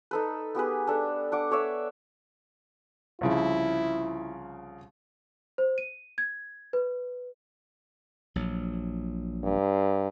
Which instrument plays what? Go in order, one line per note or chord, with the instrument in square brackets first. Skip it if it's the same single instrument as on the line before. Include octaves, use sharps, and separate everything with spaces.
[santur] D#4 A4 B4
B3 G4 G#4 B4
D4 A4
D4 F#5 D6
A4 C#5 D5 E5
[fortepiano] C2 C#3 F3 [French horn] E4
[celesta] C5
D#7
G#6
B4
[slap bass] A#1 F#3
[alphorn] G2